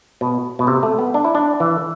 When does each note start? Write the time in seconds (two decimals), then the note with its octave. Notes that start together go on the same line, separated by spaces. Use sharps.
0.21 B2
0.59 B2
0.67 C3
0.83 A3
0.99 B3
1.14 D4
1.24 E4
1.35 D4
1.60 E3